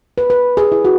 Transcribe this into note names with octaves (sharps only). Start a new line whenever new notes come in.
B4
B4
G#4
E4
F#4